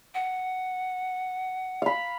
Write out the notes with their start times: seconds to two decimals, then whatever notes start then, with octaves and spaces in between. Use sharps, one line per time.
0.15 F#5
1.82 F5 B5